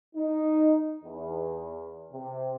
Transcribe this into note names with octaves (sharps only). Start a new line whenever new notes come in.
D#4
E2
C3